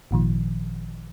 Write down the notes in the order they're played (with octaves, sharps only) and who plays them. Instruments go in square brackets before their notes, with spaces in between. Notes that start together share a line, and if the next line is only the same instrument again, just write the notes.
[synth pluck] G#1 A#2 D#3 F3